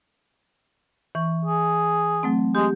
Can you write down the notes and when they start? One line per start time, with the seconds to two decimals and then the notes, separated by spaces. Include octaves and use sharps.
1.15 E3 C#6
1.45 G#4
2.23 F#3 A3 C4
2.55 G#3 G4